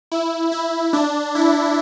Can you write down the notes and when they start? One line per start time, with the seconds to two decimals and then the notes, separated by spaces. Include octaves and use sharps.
0.12 E4
0.52 E4
0.93 D4
1.35 E4